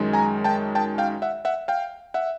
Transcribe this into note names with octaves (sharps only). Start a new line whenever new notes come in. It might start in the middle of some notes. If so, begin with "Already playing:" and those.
Already playing: F#2 D#3 G#3
G#5 A#5
G5 A5
G5 A5
F5 G5
E5 F#5
E5 F#5
F5 G5
E5 F#5